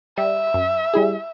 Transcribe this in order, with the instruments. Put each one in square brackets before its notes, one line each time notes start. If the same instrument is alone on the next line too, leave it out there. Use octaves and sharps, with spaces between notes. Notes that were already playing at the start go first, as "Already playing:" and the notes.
[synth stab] G3 [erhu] E5
[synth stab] F#2
G3 E4 G#4